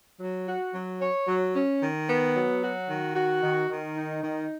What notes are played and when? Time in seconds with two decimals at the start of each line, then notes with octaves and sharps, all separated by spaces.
0.20 F#3
0.47 F#4
0.74 F#3
1.00 C#5
1.27 F#3
1.55 C#4
1.81 D#3
2.08 B3
2.35 F#3
2.62 F#4
2.88 D#3
3.15 F#4
3.42 D#3
3.69 D#3
3.96 D#4
4.23 D#3